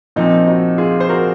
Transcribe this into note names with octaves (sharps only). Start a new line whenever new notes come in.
A#2 F3 C4 D#4
D#4 F#4
F4 G#4
C5
F#4 A#4